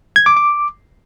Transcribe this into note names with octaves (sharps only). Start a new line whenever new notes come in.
G#6
D6
D6